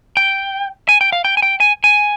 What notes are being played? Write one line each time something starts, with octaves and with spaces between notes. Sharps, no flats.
G5
G#5
G5
F5
G5
G#5
G5
G#5
G#5